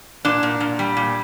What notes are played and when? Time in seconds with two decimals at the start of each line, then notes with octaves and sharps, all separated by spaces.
0.25 A#2 D4
0.43 A#2
0.60 A#2
0.79 G3
0.97 A#2